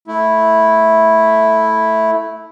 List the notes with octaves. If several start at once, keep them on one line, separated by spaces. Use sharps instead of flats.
A3 E4